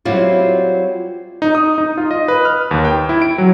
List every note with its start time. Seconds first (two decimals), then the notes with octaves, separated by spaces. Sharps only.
0.05 F#3 G3 C4 E4 F4
1.42 D#4
1.55 D#6
1.78 D#4
1.97 F4
2.11 D#5
2.28 B4
2.45 F6
2.71 D#2
2.85 G5
3.09 E4
3.22 D7
3.38 F#3